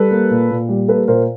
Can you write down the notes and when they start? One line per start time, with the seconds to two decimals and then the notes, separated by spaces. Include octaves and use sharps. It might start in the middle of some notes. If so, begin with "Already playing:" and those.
Already playing: G3 A4 B4
0.11 A#3
0.30 A#2
0.50 A#2
0.69 G3
0.88 A#3 A4 B4
1.08 A#2 A#4 C5